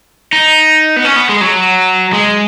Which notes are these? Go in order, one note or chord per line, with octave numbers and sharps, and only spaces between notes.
D#4
B3
C#4
B3
G#3
F#3
G#3